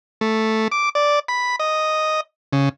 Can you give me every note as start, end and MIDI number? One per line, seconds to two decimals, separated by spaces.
0.21 0.68 57
0.72 0.89 86
0.95 1.19 74
1.28 1.56 83
1.60 2.21 75
2.53 2.69 49